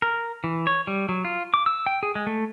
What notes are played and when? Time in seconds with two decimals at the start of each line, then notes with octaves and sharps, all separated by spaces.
0.02 A#4
0.44 E3
0.67 C#5
0.87 G3
1.09 F#3
1.25 F4
1.54 D6
1.66 E6
1.86 G5
2.03 G#4
2.15 G#3
2.27 A3